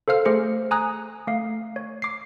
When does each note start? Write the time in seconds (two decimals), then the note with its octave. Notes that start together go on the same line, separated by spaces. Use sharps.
0.08 A4 C5 F5 F6
0.25 A3 G#4 C5 C#7
0.71 G#5 A#5 D#6 F#6
1.27 A3 F5
1.76 C#5
2.02 D6 C7